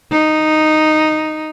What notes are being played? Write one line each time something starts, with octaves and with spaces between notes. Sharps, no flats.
D#4